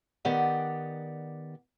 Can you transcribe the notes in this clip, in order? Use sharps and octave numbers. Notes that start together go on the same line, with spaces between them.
D#3 B3 G4 D5 F#5